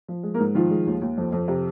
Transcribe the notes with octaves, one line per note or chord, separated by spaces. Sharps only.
F3
G#3
A#3 A#4
G#2
D#3 F3 F4
G#3
D#2
D#2
F2
F2
C3